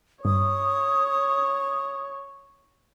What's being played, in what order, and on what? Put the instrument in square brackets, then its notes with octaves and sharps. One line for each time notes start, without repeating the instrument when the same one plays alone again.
[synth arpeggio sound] G2 [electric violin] C#5 [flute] D#6